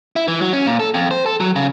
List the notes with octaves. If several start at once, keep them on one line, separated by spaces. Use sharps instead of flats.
E4
E3
F#3
C#4
A#2
A4
F2
C5
A4
F#3
C#3